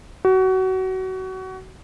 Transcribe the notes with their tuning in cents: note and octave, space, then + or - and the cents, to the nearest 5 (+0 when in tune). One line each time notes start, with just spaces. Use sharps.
F#4 +25